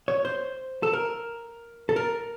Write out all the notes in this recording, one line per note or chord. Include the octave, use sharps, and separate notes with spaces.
C#5
C5
A4
A#4
A4
A#4